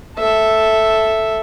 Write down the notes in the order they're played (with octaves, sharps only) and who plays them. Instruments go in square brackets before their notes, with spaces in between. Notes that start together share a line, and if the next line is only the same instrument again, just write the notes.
[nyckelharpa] A4 E5